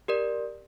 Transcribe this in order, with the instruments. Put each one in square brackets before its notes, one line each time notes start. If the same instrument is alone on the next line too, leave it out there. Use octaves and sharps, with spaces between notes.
[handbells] G4 A#4 D5